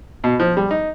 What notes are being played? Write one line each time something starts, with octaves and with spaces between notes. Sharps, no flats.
B2
F3
G3
D#4